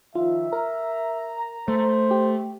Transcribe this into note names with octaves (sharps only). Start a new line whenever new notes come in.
D#3 F3 F4 E5
A#4 A#5
A3 C5
G4